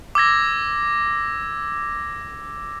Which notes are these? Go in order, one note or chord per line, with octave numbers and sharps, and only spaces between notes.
D6 E6 G#6 A#6